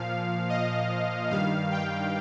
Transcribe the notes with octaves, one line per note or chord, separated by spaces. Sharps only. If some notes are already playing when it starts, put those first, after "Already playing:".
Already playing: A#2 F3 F5
D#5
G2 D#3 G3 F5
G5